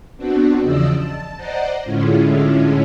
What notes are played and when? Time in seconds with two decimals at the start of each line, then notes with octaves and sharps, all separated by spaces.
0.17 B3 C4 D4 F#4
0.62 E2 C#3 F3 D5 D#5 E6
0.96 A5
1.37 C5 D5 D#5 F#5 A#5
1.84 A2 D3 G#3 C#4 E4 F4